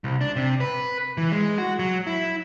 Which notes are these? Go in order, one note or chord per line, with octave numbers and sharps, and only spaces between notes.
C2
D4
C3
B4
E3
G#3
F#4
F#3
E4